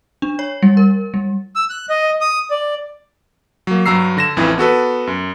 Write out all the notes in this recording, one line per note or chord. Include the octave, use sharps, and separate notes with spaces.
D4
C#5
G3
A#4
G3
E6
F#6
D#5
D#6
D5
F#3 A#3
G2 F#3 A#5 E6 C7
D3 A#6 E7
A1 F2 E3 F3
B3 F#4 A4 B4
F#2